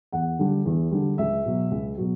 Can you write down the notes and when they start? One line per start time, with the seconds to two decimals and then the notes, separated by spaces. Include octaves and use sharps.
0.12 E2 F#5
0.39 D3 G3
0.66 E2
0.91 D3 G3
1.18 C#2 E5
1.45 B2 F#3
1.71 C#2
1.97 B2 F#3